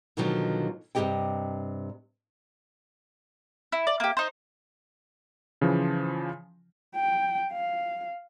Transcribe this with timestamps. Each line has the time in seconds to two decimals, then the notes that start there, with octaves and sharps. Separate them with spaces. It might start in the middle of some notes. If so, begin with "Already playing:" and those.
0.17 B2 D3 D#3 F3 F#3
0.95 G2 C3 E3 G4 D#5 G5
3.72 E4
3.87 D5
4.00 A#3 G4
4.17 D#4 C5
5.61 C#3 E3 F3
6.95 G5
7.53 F5